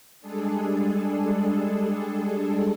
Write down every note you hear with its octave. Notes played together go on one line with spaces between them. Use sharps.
G3 G#3 D4 G#4 A4